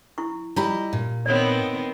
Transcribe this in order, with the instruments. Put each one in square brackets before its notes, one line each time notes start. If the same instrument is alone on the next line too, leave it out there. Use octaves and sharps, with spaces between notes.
[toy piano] E4 C#6
[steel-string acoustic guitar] G3 E4 D#5 [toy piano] F4 G4 A#5
[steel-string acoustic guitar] A#2
[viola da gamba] D#3 B3 C4 [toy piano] C#5 D5